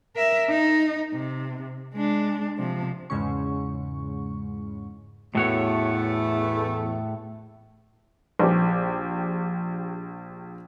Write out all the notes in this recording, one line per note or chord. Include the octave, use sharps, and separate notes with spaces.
A#4 E5
D#4
C3
G#3 D4
C3 F3
E2 G#2 C#3 G#3 C#4 C#6
E2 A2 A3 F#4 C#5
A#1 G4